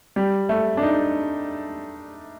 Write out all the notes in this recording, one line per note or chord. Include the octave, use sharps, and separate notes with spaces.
G3
A3
D4
D#4